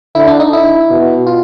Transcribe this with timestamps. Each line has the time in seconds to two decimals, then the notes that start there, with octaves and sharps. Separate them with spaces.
0.15 D3 E4
0.28 D4
0.40 D#4
0.53 E4
0.90 B2
1.27 F4